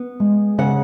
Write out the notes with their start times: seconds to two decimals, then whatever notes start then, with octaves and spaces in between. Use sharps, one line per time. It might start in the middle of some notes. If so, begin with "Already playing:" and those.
Already playing: B3
0.20 G#3
0.58 C#3 F#5